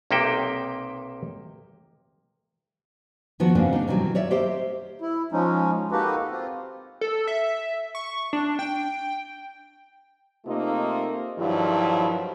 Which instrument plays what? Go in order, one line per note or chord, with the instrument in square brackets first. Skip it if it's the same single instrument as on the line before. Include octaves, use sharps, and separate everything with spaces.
[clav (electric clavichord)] B1 C3 A#3 D#4 E5 G5
[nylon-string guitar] D#3 F3 B3 F#4
C#3 A#3 C4 D4
D4 D#4
B2 D#3 E3 F#3 G3
C#5 D5 E5
G4 A#4 C5 D#5 E5
[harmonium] E4
F3 G#3 C#4 D#4
A#3 D#4 F#4 G4 A4 B4
C4 F4
[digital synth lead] A4
E5
C#6
D4
G5
[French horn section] C3 A3 A#3 D#4 F4
G2 D#3 F3 F#3 E4